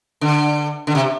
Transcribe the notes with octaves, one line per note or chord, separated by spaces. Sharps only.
D3
D3
C3